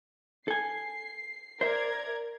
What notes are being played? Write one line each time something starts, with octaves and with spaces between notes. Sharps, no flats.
A4 G#5 C7
A#4 C5 D5 E5 G#6